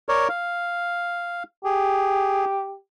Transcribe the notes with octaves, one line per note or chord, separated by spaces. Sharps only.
A#4 C#5 D5
F5
G4 G#4